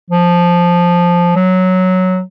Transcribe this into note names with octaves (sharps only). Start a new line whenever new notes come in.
F3
F#3